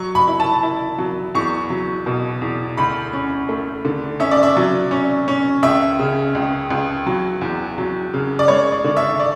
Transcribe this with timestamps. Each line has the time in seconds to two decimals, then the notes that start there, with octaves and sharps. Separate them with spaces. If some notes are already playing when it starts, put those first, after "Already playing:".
Already playing: F#3 C#6
0.15 B5
0.28 E4
0.40 A5
0.63 E4
0.98 F#3
1.35 E2 C#6
1.70 F#3
2.06 B2
2.42 E2
2.77 D2 B5
3.13 C#4
3.49 A3
3.85 D3
4.20 C#4 E5
4.31 D5
4.43 E5
4.57 F#3
4.91 C#4
5.28 C#4
5.63 C#2 E5
5.99 C#3
6.35 C#2
6.70 C#2
7.07 F#3
7.41 E2
7.78 F#3
8.14 C#3
8.39 D5
8.48 G#3 C#5
8.72 D5
8.84 D3
8.97 E5
9.20 D5